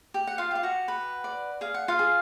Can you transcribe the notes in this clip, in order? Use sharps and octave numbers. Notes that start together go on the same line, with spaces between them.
G4
F#5
F4 F5
G4 F5
F#4 F#5
B4
D5
G#4 F5
F#5
F4 F5
G#4